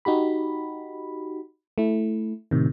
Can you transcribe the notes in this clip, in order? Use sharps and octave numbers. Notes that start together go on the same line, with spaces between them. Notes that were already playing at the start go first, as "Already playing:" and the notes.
D#4 F#4 G4 B5
A3 E4
A2 C3 D#3